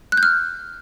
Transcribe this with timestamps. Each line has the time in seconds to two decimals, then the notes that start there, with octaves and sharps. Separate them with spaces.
0.12 F#6
0.17 G6
0.23 F6